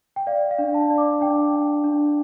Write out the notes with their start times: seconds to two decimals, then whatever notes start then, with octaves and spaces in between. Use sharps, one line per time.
0.16 G5
0.27 D5 F5
0.51 F5
0.59 D4
0.74 A5
0.90 D5
0.98 D6
1.21 D4 G5
1.53 D4
1.84 D4